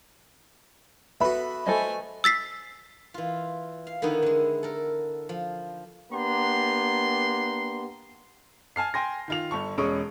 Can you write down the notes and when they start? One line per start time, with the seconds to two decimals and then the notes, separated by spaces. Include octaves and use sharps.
1.21 B3 F#4 A4 B4 E5 B5
1.67 A3 A4 C5 D#5 G#5
2.24 E6 A6 B6 C7
3.14 E3 F4
3.87 F5
4.02 D3 D#3 B3 D#4 E4
4.22 D3 G#3
4.63 A4 A#4
5.29 F3
6.12 A#3 B3 D4 G4 A#5 C6
8.76 G#5 A5 F6 C7
8.94 G5 G#5 C6 A#6
9.28 D#3 F4 F7
9.51 G1 A4 C#6
9.78 E1 G#3 C#4 C#6 D#6 D7